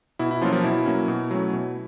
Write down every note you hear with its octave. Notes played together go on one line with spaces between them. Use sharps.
B2 E4
E4
F3 F#3 A#3 C#4 F4
F3 F4
B2 E4
F#3 A#3 C#4
B2
F#3 A3 C#4
B2